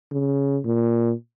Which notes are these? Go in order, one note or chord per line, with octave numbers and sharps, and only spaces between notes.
C#3
A#2